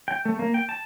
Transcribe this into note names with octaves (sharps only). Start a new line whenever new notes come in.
G5
A3
A#3
G5
A5